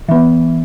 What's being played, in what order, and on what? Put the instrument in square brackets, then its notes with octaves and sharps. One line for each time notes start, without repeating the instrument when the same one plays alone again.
[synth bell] E3 B3